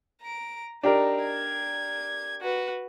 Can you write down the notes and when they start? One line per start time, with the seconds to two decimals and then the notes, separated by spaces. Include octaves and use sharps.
0.22 A#5 D7
0.83 D4 D#4 G4 A#4
1.23 G#6
2.41 F#4 B4